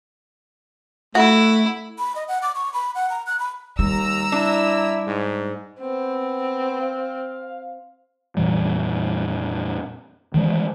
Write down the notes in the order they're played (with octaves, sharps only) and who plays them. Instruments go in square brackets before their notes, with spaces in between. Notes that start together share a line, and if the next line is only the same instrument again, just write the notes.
[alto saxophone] A3 [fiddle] E4 [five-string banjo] F#4
[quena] B5
D#5
F#5
D6
C#6
B5
F#5
A#5
F#6
B5
[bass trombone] D#2 [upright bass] G3 [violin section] A#5 E6
[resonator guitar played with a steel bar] D4 [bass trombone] E4
[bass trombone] G#2
[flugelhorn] B3 [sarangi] C4
[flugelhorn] F5
[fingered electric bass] F2 A#2 E3 G3
D#3 E3 G#3